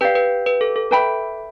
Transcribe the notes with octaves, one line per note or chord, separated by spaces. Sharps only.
G4 B4 D5 F5
B4
B4
A4
A4
B4 E5 G5 B5